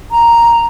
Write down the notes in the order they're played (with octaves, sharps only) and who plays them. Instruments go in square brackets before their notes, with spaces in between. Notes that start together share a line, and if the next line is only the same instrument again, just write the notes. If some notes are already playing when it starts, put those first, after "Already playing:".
[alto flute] A#5